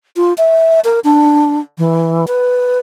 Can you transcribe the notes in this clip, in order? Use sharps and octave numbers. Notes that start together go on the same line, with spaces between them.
F4
E5
A#4
D4
E3
B4